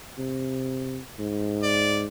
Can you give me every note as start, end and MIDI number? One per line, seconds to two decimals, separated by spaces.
0.18 0.98 48
1.19 2.06 44
1.63 2.02 74